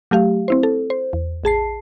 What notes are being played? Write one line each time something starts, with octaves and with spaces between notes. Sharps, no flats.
F#3 A3 G4 F5
C4 E4 C5
A4
C5
E2
A1 G#4 A5 C7